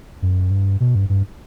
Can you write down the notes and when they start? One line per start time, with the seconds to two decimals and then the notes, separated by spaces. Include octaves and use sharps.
0.22 F#2
0.51 G2
0.80 B2
0.95 G2
1.09 G2